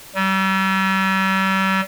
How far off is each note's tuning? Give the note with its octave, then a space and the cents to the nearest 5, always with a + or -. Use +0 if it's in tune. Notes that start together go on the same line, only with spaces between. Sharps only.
G3 -40